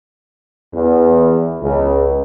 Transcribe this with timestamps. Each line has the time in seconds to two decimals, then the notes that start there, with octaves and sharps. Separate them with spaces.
0.73 E2
1.61 C#2